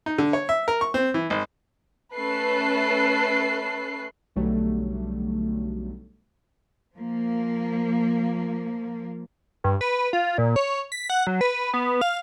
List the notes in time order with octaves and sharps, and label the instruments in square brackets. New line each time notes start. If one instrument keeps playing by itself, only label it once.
[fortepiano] D#4
D3
C#5
E5
A#4
C#6
C4
E3
G#1
[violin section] A3 C#4 A4 B4 F#6 C7
[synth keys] B1 D3 F#3 G3 A3
[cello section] F3 A#3
[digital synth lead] G2
B4
F4
A#2
C#5
B6
F#5
F#3
B4
B3
F5